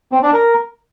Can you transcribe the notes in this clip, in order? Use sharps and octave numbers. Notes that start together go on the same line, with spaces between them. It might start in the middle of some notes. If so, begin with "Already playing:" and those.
C4
D4
A#4